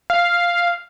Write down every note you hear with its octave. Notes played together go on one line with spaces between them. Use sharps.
F5